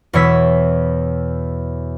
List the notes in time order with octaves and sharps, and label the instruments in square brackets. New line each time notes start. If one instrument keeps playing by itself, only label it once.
[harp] E2 B2 E3 C#5 E6 B6